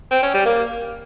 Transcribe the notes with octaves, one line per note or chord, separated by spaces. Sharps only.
C4
C#4
G3
A#3